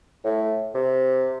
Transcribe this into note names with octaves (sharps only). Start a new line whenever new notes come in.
A2
C3